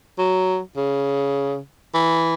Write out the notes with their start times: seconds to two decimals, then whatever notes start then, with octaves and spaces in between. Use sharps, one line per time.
0.19 F#3
0.77 C#3
1.94 E3